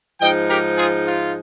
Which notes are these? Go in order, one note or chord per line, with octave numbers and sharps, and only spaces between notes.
G#2 F3 G#3 D#4 D#5 G5
G4 A#4
F4 G#4
F4